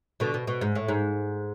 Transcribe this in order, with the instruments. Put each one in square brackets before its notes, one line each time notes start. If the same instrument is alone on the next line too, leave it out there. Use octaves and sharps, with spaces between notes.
[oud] B2 D3
B2
B2
G#2
A2
G#2